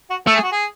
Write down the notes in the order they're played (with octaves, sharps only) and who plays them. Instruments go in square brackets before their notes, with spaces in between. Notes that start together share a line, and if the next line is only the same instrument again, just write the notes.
[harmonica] F#4
[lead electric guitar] A3 [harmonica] A4
[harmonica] G#4
F#4
G#4